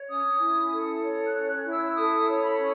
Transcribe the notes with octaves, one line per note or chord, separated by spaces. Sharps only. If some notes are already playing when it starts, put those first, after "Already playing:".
Already playing: C#5
C#4 D#6
E4
A4
C#5
F#6
C#4
F#6
E4
E6
A4 D#6
C#5
B5
C#4